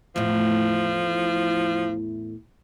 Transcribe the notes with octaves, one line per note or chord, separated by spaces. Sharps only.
E2 A2 F3